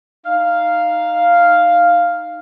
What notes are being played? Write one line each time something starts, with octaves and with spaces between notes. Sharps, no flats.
D#4 F5